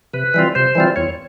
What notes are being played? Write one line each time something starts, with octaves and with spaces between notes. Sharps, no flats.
C3 B4
E3 G3 C4 F4
C3 C5
E3 G3 C4 F4
E2 C#5